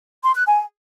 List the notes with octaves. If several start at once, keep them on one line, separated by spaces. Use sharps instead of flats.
C6
F#6
G#5